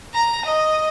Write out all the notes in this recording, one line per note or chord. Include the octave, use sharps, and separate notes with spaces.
A#5
D#5